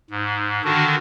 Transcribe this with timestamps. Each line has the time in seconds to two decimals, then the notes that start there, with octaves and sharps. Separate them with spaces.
0.10 G#2
0.64 D3 D#3 D4 F#4